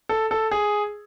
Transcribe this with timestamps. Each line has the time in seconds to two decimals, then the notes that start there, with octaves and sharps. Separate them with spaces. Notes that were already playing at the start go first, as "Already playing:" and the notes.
0.09 A4
0.31 A4
0.51 G#4